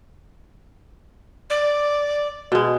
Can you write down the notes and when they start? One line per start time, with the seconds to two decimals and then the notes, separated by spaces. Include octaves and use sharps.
1.50 D5
2.52 B2 G#3